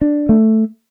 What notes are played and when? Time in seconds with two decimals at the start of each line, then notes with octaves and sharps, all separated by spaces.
0.01 D4
0.29 A3